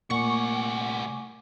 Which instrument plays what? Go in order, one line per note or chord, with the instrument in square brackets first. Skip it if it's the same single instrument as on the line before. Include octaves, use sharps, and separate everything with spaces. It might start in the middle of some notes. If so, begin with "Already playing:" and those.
[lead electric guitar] C2 F#5 [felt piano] A#2 A#3 [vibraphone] A3 G#5 D6 [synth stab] C#6